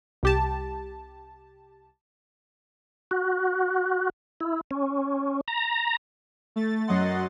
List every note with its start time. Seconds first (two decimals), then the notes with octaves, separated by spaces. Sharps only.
0.23 C2 G4 A5
3.11 F#4
4.40 E4
4.71 C#4
5.48 A#5
6.56 A3 A6
6.87 F#2 F#3 D#5 F#5 C6 A6